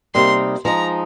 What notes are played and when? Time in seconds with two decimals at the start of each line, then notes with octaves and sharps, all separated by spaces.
0.14 C3 G3 A#3 D#4 C6
0.65 F3 G#3 D#4 A#5